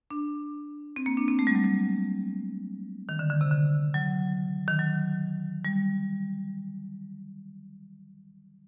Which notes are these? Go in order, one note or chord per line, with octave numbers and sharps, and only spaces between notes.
D4
C4
A#3
D4
C4
A3
G3
F#3
G3
D#3
D3
D3
C3
D3
F#3
D#3
F#3
G3